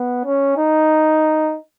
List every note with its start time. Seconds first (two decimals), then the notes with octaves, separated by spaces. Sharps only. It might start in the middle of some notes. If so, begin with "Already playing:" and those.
Already playing: B3
0.25 C#4
0.57 D#4